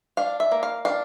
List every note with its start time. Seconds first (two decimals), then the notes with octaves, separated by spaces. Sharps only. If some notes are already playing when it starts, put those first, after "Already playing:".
0.17 D4 F5
0.40 E5
0.52 A#3
0.63 F5
0.85 D4 F5